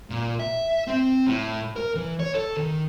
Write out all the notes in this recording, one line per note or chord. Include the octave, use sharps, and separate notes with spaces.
A#2
E5
C4
A2
A#4
E3
C#5
A4
D#3